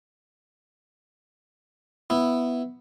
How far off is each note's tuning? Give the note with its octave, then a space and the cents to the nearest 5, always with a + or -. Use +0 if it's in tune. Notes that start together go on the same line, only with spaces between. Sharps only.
B3 +5 E4 +0